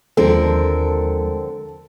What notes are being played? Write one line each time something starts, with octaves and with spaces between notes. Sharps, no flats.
D#2 D3 F3 G#3 C4 A4 A#4